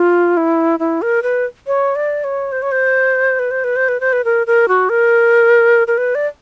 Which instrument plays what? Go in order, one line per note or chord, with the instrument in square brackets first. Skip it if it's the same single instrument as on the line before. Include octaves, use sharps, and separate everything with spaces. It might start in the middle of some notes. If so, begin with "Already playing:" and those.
Already playing: [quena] F4
E4
E4
A#4
B4
C#5
D5
C#5
C5
C#5
C5
B4
C5
B4
C5
B4
C5
B4
A#4
A#4
F#4
A#4
A#4
B4
D5